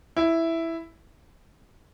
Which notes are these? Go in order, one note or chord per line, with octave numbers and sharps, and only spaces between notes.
E4